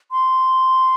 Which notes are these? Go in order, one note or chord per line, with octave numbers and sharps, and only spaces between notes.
C6